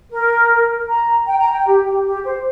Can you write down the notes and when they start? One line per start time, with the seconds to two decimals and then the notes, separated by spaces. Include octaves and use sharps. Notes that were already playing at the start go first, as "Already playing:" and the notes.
0.11 A#4
0.89 A#5
1.27 G5
1.39 A#5
1.51 G5
1.66 G4
1.86 G4
2.05 G4
2.24 C5